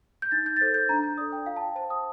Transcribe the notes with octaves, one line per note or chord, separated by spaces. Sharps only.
G6
D#4 A6
G6
A6
A4 C5 G6
G6
D4 A#5
G6
A4 D5 D#6
G5
F4 F5
A5
G5
C5 A5
D#6